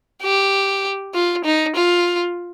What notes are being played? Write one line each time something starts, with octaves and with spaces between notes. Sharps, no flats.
G4
F4
D#4
F4